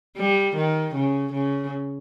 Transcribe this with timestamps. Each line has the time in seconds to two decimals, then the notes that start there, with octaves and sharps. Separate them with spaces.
0.17 G3
0.56 D#3
0.94 C#3
1.33 C#3